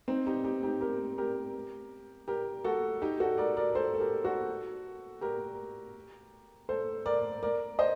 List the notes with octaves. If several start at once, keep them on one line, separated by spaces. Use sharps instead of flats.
C4 D#4
D#4 G4
D#4 G4
D#4 G4
G4 A#4
G4 A#4
G4 A#4
F#4 A4
D#4 G4
F#4 A4
A#4 D5
A#4 D5
A4 C5
A4
G4 A#4
F#4 A4
G4 A#4
A4 C5
A#4 D5
A#4 D5
C5 D#5